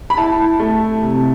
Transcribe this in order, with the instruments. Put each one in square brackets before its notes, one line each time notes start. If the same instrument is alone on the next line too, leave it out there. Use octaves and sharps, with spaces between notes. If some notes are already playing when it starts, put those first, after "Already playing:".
[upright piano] B5
E4 A5
A3
C3